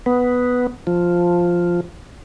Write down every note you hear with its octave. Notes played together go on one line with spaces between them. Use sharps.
B3
F3